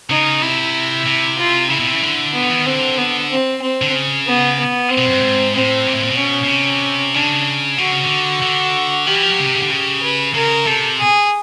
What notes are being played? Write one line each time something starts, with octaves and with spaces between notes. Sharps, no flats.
C#3 D#4
C3 E4
C3
F4
C#3 E4
B2
C3
C#3
D3
B3
E3
D#3
D3 C4
B3
C4
C4
D3
C#3
B3
B3
C4
B2
F#2
G2
G#2
A2 C4
A#2
A2
A#2
B2
C#4
B2
C3
C#3 D4
D3 F#4
C#3
D3
D3
D#3 G4
E3
F3
F#3
C#3
C3
C#3
D3
C#3 G4
B4
C#3 A#4
C3 A4
G#4